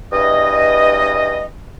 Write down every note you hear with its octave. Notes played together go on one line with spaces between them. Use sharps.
E2 G2 D#5